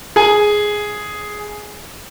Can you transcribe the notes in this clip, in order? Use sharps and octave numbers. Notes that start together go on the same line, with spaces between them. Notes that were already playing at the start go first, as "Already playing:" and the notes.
G#4 G#5